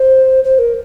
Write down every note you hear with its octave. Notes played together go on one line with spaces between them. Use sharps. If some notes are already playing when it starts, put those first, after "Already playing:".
Already playing: C5
C5
A#4